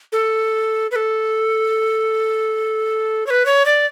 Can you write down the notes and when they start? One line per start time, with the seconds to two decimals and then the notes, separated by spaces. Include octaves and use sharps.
0.12 A4
0.91 B4
0.96 A4
3.26 C#5
3.30 B4
3.45 C#5
3.65 D5